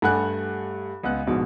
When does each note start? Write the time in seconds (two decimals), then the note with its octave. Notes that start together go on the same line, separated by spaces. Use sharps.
0.02 G2 A3 F#5 G#5 F#6
1.03 C#2 B3 F#6
1.27 A#1 G#2 B2